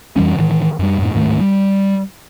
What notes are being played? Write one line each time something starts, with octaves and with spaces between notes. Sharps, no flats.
F2 E3 G3 C#4
A2 D#3 E3
F#2 G3
F#2 A2
D1 G#2 D#3 A3
G3